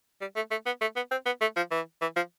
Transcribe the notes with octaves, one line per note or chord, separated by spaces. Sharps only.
G3
A3
A3
B3
A3
B3
C4
B3
A3
F3
E3
E3
F3